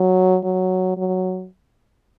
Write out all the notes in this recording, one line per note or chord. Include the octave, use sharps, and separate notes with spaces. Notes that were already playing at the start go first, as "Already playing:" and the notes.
Already playing: F#3
F#3
F#3